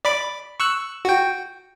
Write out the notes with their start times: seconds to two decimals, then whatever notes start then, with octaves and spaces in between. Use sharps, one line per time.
0.05 D5 B5 D6
0.60 C#6 E6 F#6
1.05 F#4 G5